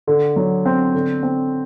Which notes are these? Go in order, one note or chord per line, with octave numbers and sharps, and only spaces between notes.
D3
F#3
C4
D3
C4